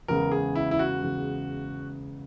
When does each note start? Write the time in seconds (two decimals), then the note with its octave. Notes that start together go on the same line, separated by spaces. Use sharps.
0.08 E2 C#3 G#3 A#4
0.31 G#4
0.55 E4
0.71 E4
0.79 F#4
1.03 E2 C#3 G#3